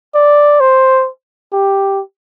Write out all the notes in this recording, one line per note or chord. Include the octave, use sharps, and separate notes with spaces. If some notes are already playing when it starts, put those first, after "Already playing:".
D5
C5
G4